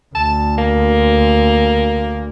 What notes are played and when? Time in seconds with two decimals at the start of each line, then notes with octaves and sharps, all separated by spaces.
0.15 D2 A5
0.58 A#3